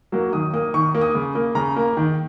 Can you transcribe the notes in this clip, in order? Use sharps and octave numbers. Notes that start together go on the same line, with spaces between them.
F#3 A#3
D#3 D#6
A#3 D#6
D#3 C#6
A#3
D#6
C#3
A#3
C#3 A#5
A#3
D#3